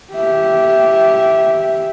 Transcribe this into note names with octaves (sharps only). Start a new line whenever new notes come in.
G4 E5